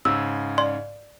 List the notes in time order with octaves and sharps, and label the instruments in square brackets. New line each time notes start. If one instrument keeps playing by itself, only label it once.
[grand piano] G#2 C#3 [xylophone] E6
[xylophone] D5 C6